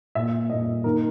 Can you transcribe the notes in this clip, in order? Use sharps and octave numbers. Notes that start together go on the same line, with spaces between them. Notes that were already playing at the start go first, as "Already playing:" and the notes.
A#2 A#3 E5
A#2 A#3 D#5
D#3 A#3 A#4